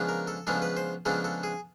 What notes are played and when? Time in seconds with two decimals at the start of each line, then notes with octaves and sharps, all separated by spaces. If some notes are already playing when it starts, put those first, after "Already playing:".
Already playing: C#3 F3 G#3 B3 D4
0.09 A#4
0.27 A4
0.47 C#3 F3 G#3 B3 D4 A4
0.62 B4
0.77 C5
1.05 C#3 F3 G#3 B3 D4 A4
1.24 A4
1.43 G#4